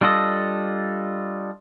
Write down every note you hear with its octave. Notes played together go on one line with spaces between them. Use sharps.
G3 D4 F4 A4 D#5